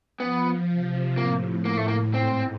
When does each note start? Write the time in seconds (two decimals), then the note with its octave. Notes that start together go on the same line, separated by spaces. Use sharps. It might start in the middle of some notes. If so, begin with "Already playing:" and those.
0.20 F3 B3
0.69 C3
1.16 A2 A#3
1.65 A#3
1.77 A3
1.88 A#3
2.14 G#2 C4